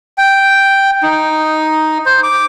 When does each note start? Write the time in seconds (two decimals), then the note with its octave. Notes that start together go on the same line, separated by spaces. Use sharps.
0.18 G5
1.03 D#4
2.06 C5
2.23 D6